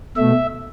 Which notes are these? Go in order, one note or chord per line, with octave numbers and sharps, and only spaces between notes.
B2 A3 E5